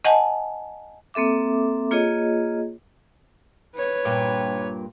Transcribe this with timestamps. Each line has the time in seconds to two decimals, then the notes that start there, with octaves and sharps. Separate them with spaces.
0.05 D#5 F#5 G#5 A5
1.14 A#3 C4 A4 E5 D6
1.91 A#3 F4 G#4 C#5 D#5
3.75 B4 C#5
4.05 G2 A#2